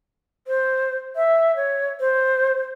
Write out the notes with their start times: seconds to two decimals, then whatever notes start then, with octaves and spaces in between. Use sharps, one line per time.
0.47 C5
1.16 E5
1.56 C#5
2.00 C5